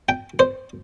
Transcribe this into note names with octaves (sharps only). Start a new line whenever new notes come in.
G5
C5